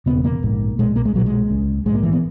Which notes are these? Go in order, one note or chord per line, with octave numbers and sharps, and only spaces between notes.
E1 D#2 C#3 B3
A#3
A#1 G#2
B1 A#2 G#3
A#3
G#3
B1 A#2 F#3
G#3
C#2 C#3
A#1 G#2 G#3
A#3
E3
B3